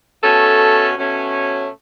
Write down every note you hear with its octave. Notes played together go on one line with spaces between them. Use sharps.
B2 A3 C#4 A4
B2 A3 C#4